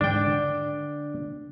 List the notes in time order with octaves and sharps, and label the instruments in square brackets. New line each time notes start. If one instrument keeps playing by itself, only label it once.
[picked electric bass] G#2 D3 [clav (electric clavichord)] D4 G5
[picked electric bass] D3